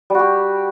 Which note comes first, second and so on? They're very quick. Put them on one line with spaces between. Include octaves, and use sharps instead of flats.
G3 F#4 G4